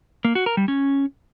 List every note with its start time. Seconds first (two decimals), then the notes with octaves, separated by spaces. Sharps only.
0.25 A#3
0.35 F#4
0.46 A#4
0.57 G3
0.68 C#4